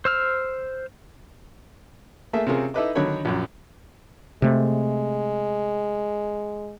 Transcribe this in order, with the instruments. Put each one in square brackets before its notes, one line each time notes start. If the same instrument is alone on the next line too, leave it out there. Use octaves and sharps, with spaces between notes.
[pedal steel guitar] C5 E6 F6
[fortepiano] A3 A#3 G#4 E5
C3 C4 C#4 F4 G#4 A#4
D#4 E4 A4 B4 D#5 D6
D3 D#3 F#3 C#5 B5
A#1 F#2
[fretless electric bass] C3 A3 [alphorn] G#3